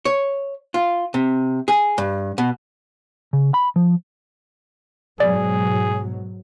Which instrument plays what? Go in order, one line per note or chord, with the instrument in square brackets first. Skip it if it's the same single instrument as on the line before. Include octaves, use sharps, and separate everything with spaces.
[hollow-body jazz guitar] C#5
F4
C3
G#4
G2
B2
[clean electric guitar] C#3
B5
F3
[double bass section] G#2 B2 F#3 [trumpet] G#4 [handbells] D5